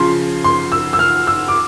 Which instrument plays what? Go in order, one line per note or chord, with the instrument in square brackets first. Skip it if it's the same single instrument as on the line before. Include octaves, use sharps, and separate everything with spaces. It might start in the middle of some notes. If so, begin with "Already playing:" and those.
Already playing: [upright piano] C#3 F3 C6
C6
E6
E6
F6
E6
D6